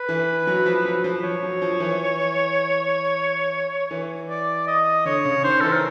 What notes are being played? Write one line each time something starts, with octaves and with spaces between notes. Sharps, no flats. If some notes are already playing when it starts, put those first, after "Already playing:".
Already playing: B4
E3
F#3
F3
F#3
F3
F3 C#5
F#3
F3
E3
E3
D5
D#5
D3 C#5
C#3
D#3 C5
E3 A4
A#4